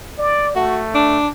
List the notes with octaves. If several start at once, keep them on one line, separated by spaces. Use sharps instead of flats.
D5
A3 F#4
D4